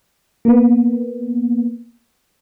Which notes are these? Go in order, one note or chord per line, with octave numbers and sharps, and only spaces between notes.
A#3 B3